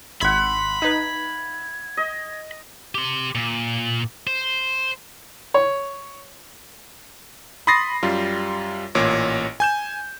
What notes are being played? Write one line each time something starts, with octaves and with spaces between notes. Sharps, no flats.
G#1 E5 F#5 B5 C6 G#6 B6
D#4 B4 G#6
D#5
G4 C6
A#2
C5
C#5
B5 C6 D#6 A6 A#6 C7
F#2 G3 F4
A1 A#2 C#5
G#5 G6 E7